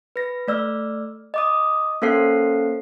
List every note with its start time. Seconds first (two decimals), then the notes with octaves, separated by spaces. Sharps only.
0.16 B4 A#6
0.48 A3 D5 E6 F6
1.34 D#5 D6 D#6
2.02 A#3 C#4 A4 C5 F5 C7